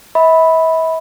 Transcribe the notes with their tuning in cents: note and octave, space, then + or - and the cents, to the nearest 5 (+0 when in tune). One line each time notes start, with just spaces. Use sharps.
E5 -40 B5 +0